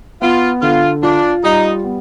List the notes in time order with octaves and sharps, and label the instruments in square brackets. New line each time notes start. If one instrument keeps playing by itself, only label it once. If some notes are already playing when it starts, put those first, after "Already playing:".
[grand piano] B3 [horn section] F4
[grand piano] D3 [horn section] F4
[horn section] D4 [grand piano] F4
[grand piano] G3 [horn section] D#4
[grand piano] B3